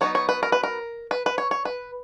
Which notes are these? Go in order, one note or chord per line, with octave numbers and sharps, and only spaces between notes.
F#3 B3 D#4 C#5
C#5
B4
A#4
B4
A#4
B4
B4
C#5
C#5
B4